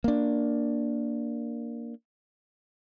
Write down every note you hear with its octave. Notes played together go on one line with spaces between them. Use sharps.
A#3 D4